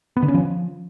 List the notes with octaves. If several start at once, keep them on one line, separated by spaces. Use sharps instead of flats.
B3
D3
C#4
F3